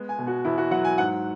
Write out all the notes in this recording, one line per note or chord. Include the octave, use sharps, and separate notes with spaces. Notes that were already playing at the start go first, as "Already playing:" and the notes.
Already playing: G#3 B3
G#5
B2
F#4
E2 E4
F#4
F#3 F#5
G#5
G#2 F#5